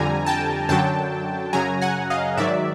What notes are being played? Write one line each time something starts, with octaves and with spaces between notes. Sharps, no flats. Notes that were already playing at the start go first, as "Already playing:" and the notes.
Already playing: F2 D3 G3 G#5 A#5
G5 A5
F#2 D3 F#3 G5 A5
F#2 C#3 F#3 G#5 A#5
F#5 G#5
D#5 F5
G#2 D#3 F#3 D5 E5